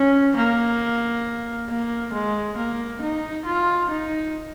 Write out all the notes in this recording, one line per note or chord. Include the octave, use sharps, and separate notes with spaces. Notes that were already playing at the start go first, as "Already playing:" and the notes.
Already playing: C#4
A#3
A#3
G#3
A#3
D#4
F4
D#4